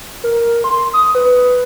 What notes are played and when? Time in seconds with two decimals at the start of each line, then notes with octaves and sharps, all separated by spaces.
0.24 A#4
0.64 C6
0.93 D#6
1.15 B4